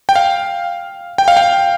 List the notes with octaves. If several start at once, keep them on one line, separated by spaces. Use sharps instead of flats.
G5
F5
G5
F5
G5